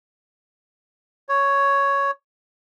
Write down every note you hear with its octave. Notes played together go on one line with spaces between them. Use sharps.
C#5